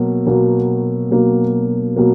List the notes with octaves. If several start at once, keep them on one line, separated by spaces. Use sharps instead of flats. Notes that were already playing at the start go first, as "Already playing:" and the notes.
Already playing: B2 F#3 A#3
B2 F#3 A#3
B2 F#3 A#3
B2 F#3 A#3